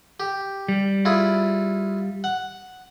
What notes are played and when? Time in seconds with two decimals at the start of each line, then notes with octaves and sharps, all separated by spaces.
0.20 G4
0.69 G3
1.05 E4 F4 G#4
2.24 F#5